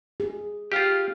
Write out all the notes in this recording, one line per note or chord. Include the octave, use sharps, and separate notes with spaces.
G#4
F4 G4 F5 G5